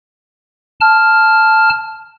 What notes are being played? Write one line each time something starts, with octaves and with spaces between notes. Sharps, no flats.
A5 F6